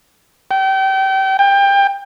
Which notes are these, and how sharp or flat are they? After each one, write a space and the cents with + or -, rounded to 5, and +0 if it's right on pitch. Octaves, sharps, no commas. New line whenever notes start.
G5 -30
G5 +25